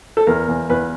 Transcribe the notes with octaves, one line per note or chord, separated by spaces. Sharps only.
A4
E2 A#4
E2
E2 B4